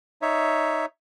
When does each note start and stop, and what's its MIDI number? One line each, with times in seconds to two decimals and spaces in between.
0.22 0.85 63
0.22 0.85 73
0.22 0.85 76